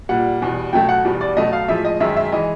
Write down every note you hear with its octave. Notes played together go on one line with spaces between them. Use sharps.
A#2 G3 F#5
E2 B2 G3
B2 F#3 A3 G5
F#5
E2 B2 G3
D5
B2 F#3 A3 D#5
F5
A2 F3 G#3 E5
D#5
F#2 D#3 G#3 E5
E5
E3 G#3 D#5